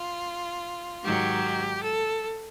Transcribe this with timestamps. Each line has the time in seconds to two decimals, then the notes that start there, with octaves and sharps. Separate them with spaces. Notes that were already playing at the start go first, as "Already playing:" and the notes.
Already playing: F4
1.03 G#2 D#3 F#3 G4
1.82 A4